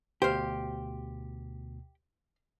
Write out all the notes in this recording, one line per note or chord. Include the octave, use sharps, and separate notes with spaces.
D2 B2 G4 C5 F5